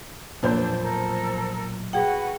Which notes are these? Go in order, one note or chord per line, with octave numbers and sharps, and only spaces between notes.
B1 F2 A#2 D4 C5 E6 G6
A4 A#4 E6
F#4 G#4 B4 F#5 G5